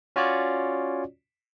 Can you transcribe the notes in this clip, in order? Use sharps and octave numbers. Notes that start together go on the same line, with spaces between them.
C#4 F4 F#4 C#5 D5